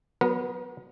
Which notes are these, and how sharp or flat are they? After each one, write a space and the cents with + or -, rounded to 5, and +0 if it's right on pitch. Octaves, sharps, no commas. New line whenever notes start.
F#3 +0 B3 +0 A#4 +40